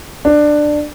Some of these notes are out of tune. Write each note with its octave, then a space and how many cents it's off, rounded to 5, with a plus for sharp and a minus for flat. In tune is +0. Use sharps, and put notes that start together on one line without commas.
D4 +15